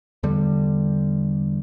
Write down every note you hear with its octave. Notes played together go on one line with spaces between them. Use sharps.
E2 D3 G3